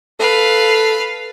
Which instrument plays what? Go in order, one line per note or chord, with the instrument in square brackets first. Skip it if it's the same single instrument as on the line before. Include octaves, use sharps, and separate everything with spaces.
[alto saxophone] A4 [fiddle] B4 F5